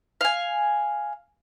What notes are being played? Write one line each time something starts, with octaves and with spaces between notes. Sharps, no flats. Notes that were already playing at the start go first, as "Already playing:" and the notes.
F5 G#5